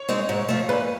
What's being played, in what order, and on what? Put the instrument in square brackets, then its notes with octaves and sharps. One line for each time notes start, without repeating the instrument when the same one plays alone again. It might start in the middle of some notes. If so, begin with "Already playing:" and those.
Already playing: [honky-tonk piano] C#5
[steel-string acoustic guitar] G#3 C4 D#4
G#2
F3 A3
[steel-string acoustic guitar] A#2 [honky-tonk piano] B4